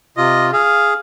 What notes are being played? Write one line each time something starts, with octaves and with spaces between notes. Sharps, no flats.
C3 F4 D#5
G#4 F5